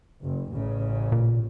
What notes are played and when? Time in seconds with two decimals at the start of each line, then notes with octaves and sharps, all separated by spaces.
0.22 F#1
0.53 A1 C#3
1.12 A#2